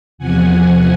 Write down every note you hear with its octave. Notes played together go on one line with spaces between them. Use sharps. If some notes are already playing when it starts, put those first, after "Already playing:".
E2 C3 F3 F#5 G#5